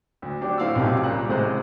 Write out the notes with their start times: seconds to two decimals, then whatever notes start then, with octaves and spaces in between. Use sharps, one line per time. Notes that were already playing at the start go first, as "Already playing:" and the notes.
0.22 D2
0.41 F#3 C4 D4 G4 C#5
0.58 A2 C5 F5 F#5 D6 E6
0.75 B1 F2 C3 D#4 F4 G4
1.03 A#2 C#3 G3 A#5 F#6
1.29 A1 C3 G#3 C5 F#6